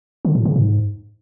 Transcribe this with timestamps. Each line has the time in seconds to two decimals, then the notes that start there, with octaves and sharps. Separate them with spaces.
0.25 D3
0.35 A2
0.45 C#3
0.56 G#2